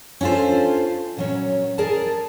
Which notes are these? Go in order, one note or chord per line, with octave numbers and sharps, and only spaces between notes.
C#4 D4 F4 A4 C5
A#2 F#3 C#4
G#4 A#4 D5 A5